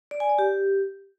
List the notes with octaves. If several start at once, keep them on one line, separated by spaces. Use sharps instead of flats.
D5
G#5
D5
G4